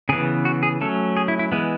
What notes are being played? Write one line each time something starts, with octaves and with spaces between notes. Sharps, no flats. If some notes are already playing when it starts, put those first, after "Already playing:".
C#3 E3 B3 G#4
F#4
G#4
F#3 A3 C#4 A4
G#4
E4
E4
E3 G#3 B3